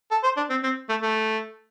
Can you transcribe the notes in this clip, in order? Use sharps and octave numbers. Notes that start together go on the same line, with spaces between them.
A4
C5
D4
C4
C4
A3
A3